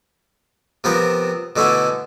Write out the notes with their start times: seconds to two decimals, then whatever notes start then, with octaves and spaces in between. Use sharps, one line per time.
0.84 C3 F3 B3 C4 A#4
1.56 B2 D3 A3 C#4 E4